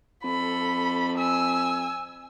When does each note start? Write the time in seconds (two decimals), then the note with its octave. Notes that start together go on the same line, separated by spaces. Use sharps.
0.24 F2 A4 B5
1.17 G#5 E6